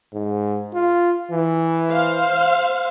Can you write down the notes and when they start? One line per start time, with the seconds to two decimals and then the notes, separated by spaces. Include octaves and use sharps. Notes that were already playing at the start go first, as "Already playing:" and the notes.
0.14 G#2
0.74 F4
1.31 E3
1.90 C5 F5